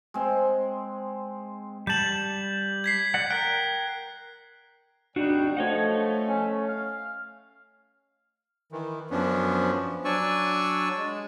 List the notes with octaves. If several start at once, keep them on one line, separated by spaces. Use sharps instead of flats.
G#3 C4
G3 A5 G6 F#7
G#6 B6 C7
D5 F#5
A#4 G5 F#6
G#1 G3 D4 D#4 F#4 G5
F3 A3 C#5 D#5 F#5
C#4
F5
D#3 E3
F#2 F3 B3 C#4 D4
F#3 D4 D5 G#5 C#6 E6
G#3